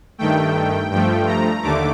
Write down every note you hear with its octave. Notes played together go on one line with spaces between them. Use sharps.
G2 D#3 A3 G5
G2 F3 A3 G5
A#5
D#2 D3 A3 D6